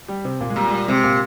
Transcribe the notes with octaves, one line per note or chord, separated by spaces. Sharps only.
G3 G4
C3 C4
A#2 A#3
G#3
A#2 G3
G#3
G3
C3 G#3
A#2 A#3